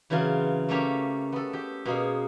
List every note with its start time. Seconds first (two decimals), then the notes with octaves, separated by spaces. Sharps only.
0.10 C#3 E3 F#3 C4 F4
0.69 A3 A#3 C#4 G4
1.32 B3 A4
1.53 G4
1.85 B2 A#3 C#4 G#4